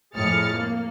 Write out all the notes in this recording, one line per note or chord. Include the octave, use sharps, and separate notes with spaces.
F2 A2 G#4 F6 A6 C#7
A#3